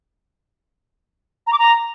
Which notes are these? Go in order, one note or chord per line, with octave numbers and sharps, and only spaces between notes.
A#5
D6
A#5